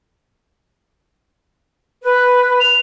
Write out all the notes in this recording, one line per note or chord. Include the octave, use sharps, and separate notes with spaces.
B4
F7